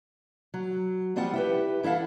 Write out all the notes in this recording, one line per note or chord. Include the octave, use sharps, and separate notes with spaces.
F#3
F3 G3 C4 F4 F#5
E4 G4 B4
E3 E4 A4 F5 F#5